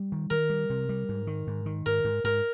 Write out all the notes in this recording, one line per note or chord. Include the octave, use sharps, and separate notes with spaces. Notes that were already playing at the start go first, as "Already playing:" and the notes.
Already playing: G3
D#3
D#3 A#4
G3
C3
G3
G#2
D#3
G#2
D#3
G#2 A#4
G#2
G#2 A#4